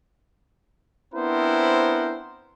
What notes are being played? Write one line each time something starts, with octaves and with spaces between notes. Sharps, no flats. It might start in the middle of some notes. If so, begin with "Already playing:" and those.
B3 C4 D4 E4 A#4 C5